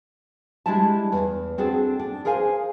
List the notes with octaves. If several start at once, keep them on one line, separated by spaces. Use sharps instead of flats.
G3 G#3 D4 E4 E5 A5
E2
C4 D4 F#4 G#4 A4
D4
G#4 A#4 C5 F5 G#5